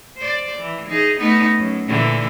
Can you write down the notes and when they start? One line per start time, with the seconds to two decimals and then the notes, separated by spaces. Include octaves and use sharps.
0.16 C5 D5
0.58 E3
0.89 D#4 G#4
1.20 A3 B3 D#4
1.58 F#2
1.88 A#2 D3 E3